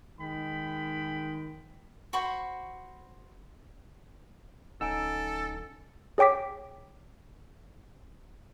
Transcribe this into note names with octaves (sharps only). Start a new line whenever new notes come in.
D#3 G#3 G5 B5
F#4 C5 B5 C#6
D1 C#4 D#4 A4 F#5 G#5 E6 D7
G#4 C#5 G5 D6 B6